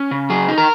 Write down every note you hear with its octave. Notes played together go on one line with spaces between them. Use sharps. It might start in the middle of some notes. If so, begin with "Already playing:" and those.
Already playing: C#4
C#3
F#3 G#4
D#4
A#4